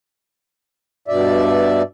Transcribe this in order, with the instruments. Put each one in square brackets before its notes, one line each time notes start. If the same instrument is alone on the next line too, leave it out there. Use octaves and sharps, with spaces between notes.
[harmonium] G2 B2 D5 E5